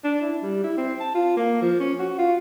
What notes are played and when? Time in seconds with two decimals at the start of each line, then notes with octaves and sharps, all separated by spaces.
0.04 D4
0.22 E4
0.42 G3
0.64 E4
0.77 C4
1.00 A5
1.15 F4
1.37 A#3
1.62 F3
1.80 C#4
1.99 F#4
2.18 F4